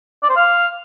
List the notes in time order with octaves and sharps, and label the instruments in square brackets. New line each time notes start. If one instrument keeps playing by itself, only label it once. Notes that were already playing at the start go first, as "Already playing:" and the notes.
[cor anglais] D5
C5
F5